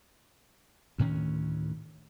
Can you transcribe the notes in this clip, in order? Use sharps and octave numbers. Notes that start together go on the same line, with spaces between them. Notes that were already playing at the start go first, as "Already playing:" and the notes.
D2 A2 D#3 C#4